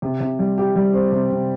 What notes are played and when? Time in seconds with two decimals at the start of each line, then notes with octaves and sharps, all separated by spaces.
0.02 C3
0.20 C3
0.39 G3
0.58 G4
0.76 G3
0.93 C4
1.12 C3
1.30 C3